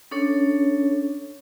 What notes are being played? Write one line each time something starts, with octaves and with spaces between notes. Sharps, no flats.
C#4 D4 A4 C#5